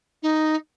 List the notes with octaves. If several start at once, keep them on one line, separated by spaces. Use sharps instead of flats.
D#4